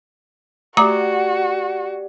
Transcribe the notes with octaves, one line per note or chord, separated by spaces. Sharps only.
A3 F#4 G4 D5 F#5 A#5 D6